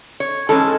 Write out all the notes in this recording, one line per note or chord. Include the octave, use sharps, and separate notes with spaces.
C#5
G#2 E3 G#3 C#4 A4